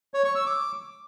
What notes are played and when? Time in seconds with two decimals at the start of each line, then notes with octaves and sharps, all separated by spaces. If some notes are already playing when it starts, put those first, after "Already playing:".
0.14 C#5
0.25 C#6
0.35 E6
0.46 D6